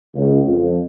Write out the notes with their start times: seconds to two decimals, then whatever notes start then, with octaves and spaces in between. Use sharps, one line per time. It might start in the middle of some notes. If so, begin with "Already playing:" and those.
0.15 C#2
0.46 F2